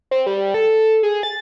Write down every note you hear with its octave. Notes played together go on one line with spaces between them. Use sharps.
C4
G3
A4
G#4
A6